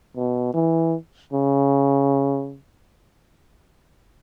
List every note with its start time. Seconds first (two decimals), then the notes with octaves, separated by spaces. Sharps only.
0.16 B2
0.54 E3
1.33 C#3